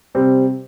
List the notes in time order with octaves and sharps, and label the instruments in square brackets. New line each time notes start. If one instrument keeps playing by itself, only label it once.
[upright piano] C3 G3 C4